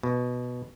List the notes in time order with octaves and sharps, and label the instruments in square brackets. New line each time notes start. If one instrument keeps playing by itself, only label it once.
[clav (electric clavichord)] B2